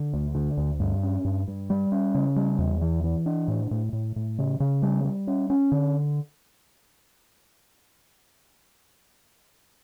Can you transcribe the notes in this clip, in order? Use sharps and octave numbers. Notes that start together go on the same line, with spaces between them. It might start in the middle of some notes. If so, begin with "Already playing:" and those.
Already playing: D3
D2
D3
D2
G2
C#4
G2
G2
G3
C#4
C#3
G3
E2
E3
E3
D4
A2
A2
A2
A2
C#3
C#3
G3
G3
C#4
C#4
D3